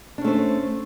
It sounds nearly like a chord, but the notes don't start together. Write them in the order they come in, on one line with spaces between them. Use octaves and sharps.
D4 C#4 A3 C5